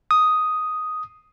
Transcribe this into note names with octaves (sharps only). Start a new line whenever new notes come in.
D#6